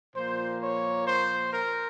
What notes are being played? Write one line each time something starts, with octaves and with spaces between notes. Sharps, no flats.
A#2 F3 A#3 C5
C#5
C5
A#4